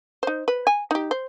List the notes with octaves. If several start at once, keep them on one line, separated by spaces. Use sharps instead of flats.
D#4 C5
B4
G#5
D#4 G4
C5